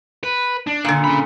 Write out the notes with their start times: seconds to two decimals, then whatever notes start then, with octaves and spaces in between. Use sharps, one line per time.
0.23 B4
0.67 D4
0.85 A#2 D3
1.04 C#3 B5